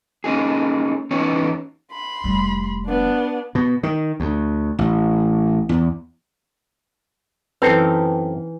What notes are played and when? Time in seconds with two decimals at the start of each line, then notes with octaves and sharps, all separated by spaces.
0.24 A#3 C#4 D#4 G#4
1.11 E2 B3 C#4 D#4 C#5
1.92 B5 C6
2.24 F1 G3
2.85 B3 D4
3.55 B2
3.83 D#3
4.20 D2
4.79 A1
5.69 E2
7.62 F#2 E3 C4 D#4 A4 B4 F5